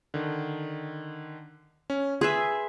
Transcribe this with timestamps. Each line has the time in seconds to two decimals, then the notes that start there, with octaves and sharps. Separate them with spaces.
0.14 D3 D#3
1.90 C#4
2.21 G#4 B4 E5 C6